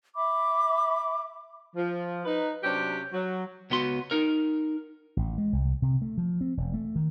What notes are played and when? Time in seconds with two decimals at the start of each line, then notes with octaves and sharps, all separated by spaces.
0.16 E5 B5 D6
1.75 F3
2.25 D#4 B4
2.63 C3 F#3 C#4 D4 G4
3.13 F#3
3.70 C#2 B3 F#4 C6
4.11 D#4 A#4
5.17 A1
5.38 G#3
5.53 C2
5.82 C3
6.02 A3
6.18 F3
6.41 C4
6.57 E1
6.74 A3
6.96 D#3